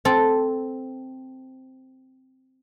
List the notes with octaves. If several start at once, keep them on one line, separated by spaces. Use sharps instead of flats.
C4 A4